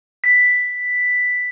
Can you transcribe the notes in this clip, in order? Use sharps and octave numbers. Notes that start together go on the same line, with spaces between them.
B6